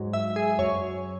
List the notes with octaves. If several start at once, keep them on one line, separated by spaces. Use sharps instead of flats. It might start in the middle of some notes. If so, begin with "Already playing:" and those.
Already playing: G#2 F#3
E5
G#4
F#2 F#3 C#5